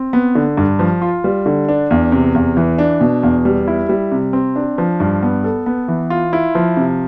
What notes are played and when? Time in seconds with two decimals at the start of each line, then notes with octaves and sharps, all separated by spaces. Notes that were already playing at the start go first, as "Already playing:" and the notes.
Already playing: C4
0.13 B3
0.35 D3
0.57 G2
0.79 F3
1.02 F4
1.24 G3
1.46 D3
1.69 D4
1.91 E2
2.12 C3
2.35 E2
2.57 E3
2.78 D4
3.01 B2
3.23 E2
3.45 G3
3.68 E4
3.89 G3
4.12 C3
4.33 C4
4.56 D4
4.78 F3
5.00 G2
5.23 B3
5.44 A4
5.66 B3
5.88 E3
6.10 F4
6.33 E4
6.55 F3
6.77 C3